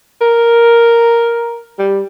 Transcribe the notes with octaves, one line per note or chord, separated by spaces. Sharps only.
A#4
G3